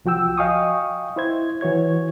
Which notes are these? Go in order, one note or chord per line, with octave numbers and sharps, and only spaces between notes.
C2 F3 F#4 G5 E6
D#5 F5 G5 G#5 C#6 D#6
E4 C5 G#6
E3 F#4 C#5 G#6